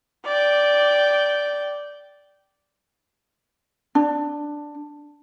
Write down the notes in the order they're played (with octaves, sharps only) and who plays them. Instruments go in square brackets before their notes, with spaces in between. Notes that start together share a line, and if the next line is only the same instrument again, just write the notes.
[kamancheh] D5 G5
[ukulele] D4